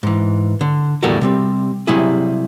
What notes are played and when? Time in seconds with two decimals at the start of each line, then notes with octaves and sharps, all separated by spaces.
0.03 G#2 E3
0.61 D3
1.03 E2 A2 G3 F#4 A4 A#4
1.21 C3 G3 C4
1.87 C3 F#3 G3 E4 G#4